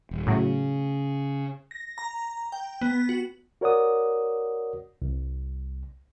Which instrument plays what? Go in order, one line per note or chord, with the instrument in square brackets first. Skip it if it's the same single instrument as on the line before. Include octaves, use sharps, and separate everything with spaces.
[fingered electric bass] D#1
[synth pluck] A2 F#3 [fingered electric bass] C#3
[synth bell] A#6
A#5
G5
B3
F#4
[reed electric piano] F#4 A#4 C#5 D5 F#5 D#6
C2